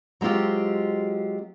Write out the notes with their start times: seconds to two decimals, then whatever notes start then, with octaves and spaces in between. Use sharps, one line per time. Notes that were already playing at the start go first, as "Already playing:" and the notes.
0.21 F#3 G#3 C4 F4 G4